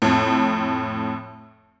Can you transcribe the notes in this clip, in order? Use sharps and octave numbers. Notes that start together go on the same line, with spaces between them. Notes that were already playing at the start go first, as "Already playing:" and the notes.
F2 A2